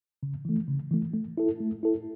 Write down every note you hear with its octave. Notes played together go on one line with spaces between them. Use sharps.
C#3
E3 A3
C#3
E3 A3
A3
E4 A4
A3
E4 A4